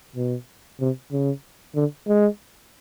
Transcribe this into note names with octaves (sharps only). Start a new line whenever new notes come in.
B2
C3
C#3
D3
G#3